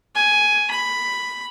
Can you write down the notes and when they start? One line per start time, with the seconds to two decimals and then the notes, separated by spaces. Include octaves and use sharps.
0.16 G#5
0.71 B5